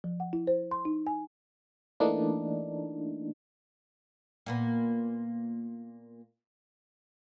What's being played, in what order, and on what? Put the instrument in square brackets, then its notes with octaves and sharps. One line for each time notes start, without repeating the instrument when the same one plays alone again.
[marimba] F3
F#5
E4
C5
C6
D#4
G#5
[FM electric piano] E3 A3 A#3 D4 D#4
[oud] A#2 A#3 B3